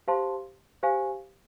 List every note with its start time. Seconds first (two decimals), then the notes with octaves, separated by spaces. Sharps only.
0.08 G4 C5 F5 A5 C6
0.83 G4 C5 F5 G#5